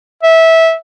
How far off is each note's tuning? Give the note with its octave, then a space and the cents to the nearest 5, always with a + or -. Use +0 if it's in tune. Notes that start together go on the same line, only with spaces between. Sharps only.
E5 -15